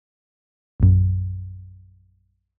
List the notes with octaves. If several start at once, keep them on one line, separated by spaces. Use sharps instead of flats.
A#1 F#2